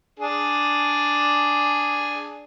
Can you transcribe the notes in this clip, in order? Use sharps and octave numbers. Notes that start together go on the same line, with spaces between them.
D4 G#4